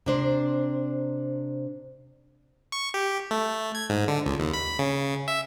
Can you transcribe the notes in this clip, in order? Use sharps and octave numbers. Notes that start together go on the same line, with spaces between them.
C3 D4 C5
C#6
G4
A3
G#6
G#2
D3
C#2
D#2
B5
C#3
E5